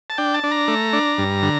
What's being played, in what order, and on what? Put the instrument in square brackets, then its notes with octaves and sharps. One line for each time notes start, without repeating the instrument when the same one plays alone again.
[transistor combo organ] A5
D4 G5
A5
D4
A#5
A3
D4
G2
D3